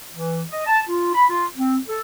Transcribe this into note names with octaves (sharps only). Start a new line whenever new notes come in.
E3
D#5
A5
F4
B5
F4
C4
A4